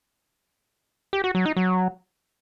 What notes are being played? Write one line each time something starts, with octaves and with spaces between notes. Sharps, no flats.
G4
F#4
F#3
D#4
F#3